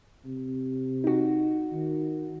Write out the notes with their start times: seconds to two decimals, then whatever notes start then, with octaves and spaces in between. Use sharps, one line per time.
0.25 C3
1.04 D#4 F#4
1.73 D#3